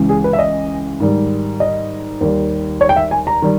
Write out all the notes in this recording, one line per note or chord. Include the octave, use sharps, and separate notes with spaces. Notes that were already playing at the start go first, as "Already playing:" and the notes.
Already playing: C#2 C#3 E3 G#3
G#4
B4
E5
D#5
G#2 D#3 G3
D#5
D#2 D#3 G3
C#5
G5
E5
G#5
A#5
D#3 G3